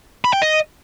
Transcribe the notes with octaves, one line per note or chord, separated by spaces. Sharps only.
B5
G5
D#5